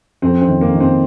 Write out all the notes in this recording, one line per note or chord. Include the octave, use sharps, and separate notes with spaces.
F2 C4
C4
D#3
A#3
D#3
C4